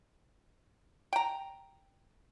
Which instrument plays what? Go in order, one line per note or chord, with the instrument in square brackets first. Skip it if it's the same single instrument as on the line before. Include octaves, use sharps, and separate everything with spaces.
[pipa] G5 A#5